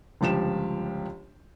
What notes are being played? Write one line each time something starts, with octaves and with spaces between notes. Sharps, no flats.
G1 C#2 F3 G4 E7